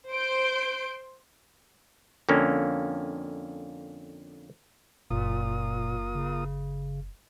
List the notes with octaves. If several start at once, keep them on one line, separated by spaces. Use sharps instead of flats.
C5 C6 G6 D7
F2 D3 A#3 C#4
F#1 A#2 A#3 F4 D#6
C#3